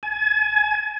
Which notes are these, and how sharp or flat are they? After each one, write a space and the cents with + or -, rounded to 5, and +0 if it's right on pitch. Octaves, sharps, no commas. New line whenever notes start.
G#5 +35